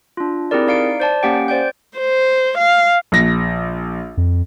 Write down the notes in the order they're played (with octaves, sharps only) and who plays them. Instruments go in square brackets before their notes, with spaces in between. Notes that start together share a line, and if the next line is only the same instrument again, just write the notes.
[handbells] D4 F4
C4 E4 G4 G#4 A#4 D5
D#4 D5 F5 C#7 D7
C5 D5 A5
A#3 C#4 G4 F#5 G5
C5 D5 G5 G6
[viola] C5
F5
[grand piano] A#1 A#6
[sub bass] F2